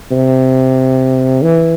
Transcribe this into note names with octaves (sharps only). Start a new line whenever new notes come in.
C3
E3